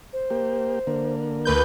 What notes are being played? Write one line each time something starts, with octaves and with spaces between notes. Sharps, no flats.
C5
A#3 G4
D3 A#3
D2 A#4 B4 G6